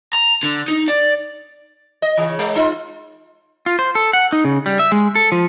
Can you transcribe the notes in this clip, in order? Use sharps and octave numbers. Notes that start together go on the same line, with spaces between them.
A#5
D3
D#4
D5
D#5
C#3 E3
G#3
D#4 F4
F4
C5
A4
F#5
D#4
C#3
G3
E5
G#3
A4
F3